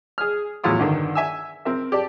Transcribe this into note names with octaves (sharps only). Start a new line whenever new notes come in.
G#4 F6
E2 A2 F#3 E4 F4 D#6
G2 D3 D#3
E5 G#5 E6
C4 A#4 E5
G4 D5 A5